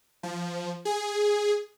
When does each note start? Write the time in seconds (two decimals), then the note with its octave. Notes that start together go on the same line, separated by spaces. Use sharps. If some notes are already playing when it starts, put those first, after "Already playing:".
0.23 F3
0.85 G#4